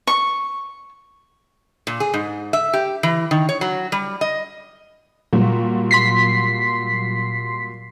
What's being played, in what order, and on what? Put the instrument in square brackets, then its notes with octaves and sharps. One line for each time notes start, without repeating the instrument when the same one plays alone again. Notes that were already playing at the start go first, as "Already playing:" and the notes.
[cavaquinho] C#6
[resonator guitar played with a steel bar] A#2
G#4
G#2
E5
G4
E3
D#3
C#5
F#3
G3
D#5
[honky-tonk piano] A#2 F#3 G3
[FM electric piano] C6 B6 C7